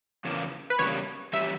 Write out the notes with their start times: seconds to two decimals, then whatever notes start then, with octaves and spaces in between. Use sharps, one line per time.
0.25 E2 C#3 E3 A#3
0.70 B4
0.79 E2 C#3 G3 A#3 C#5
1.33 E3 G3 C#4 G4 E5